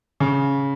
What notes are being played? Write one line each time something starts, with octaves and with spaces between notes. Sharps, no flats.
C#3